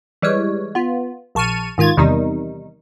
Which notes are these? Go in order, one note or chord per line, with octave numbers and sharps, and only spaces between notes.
E3 G3 G#3 C#5
B3 F4
A#1 A5 C#6 F6 D#7
G#2 D#3 F4 G#6 A6
E2 C3 D#3 G3 D#4